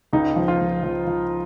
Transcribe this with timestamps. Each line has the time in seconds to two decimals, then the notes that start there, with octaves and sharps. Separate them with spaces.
0.13 C#2 D#4
0.36 F3
0.48 F4
0.60 C#2
0.83 F3
1.07 F3